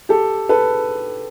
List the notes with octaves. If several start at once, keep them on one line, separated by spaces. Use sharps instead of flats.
G4 A4
A4 B4